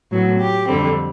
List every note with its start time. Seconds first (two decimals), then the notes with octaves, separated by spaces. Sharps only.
0.11 A2 F#3 B3
0.39 G4
0.67 F2 D3 G3 C4